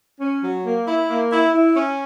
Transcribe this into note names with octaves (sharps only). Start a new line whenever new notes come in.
C#4
F#3
A#3
E4
A#3
E4
E4
C#4